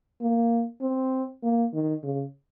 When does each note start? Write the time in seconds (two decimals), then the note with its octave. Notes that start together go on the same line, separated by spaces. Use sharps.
0.21 A#3
0.81 C4
1.43 A#3
1.74 D#3
2.04 C#3